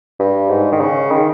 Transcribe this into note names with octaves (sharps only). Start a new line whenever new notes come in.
G2
G#2
D#3
C#3
D#3